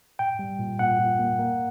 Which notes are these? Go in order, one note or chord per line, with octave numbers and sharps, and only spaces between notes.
A#2 G5
G3
A#2
A#2 F#5
A#2
A#3
A#3